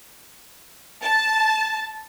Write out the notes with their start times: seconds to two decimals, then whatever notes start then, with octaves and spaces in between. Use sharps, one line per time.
1.04 A5